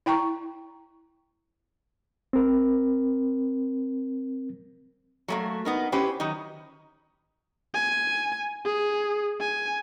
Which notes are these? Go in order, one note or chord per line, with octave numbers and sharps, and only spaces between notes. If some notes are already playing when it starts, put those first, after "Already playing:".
E4 G5 A#5 C#6
C4 A#4
F#3 A3 A#3
B3 D#4 A#4
C#4 E4 G4 B4 C5
D#3 F#3 D#4
G#5
G#4
G#5